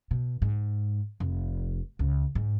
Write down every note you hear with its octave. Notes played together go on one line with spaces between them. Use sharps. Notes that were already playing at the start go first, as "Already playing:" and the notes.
B2
G#2
F1
C#2
G#2